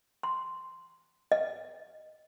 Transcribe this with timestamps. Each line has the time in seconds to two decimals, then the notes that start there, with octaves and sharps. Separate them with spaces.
0.23 C6
1.32 D#5